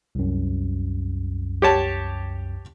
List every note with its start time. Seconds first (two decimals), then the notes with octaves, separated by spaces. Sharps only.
0.15 C2 F#2
1.62 G4 C#5 A5